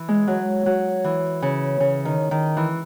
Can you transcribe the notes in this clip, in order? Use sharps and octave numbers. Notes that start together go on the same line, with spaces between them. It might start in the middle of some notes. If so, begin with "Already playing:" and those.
Already playing: E3
G#3
F#3
F#3
E3
C#3
C#3
D#3
D#3
E3